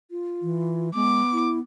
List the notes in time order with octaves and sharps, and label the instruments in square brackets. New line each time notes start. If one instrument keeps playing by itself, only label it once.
[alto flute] F4
[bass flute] E3
[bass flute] G#3 [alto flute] B3 [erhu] D6
[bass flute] E4